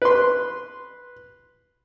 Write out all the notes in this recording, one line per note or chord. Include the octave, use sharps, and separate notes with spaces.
B4 C6